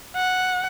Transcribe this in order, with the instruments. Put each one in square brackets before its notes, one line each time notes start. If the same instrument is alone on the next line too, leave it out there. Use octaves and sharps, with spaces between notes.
[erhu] F#5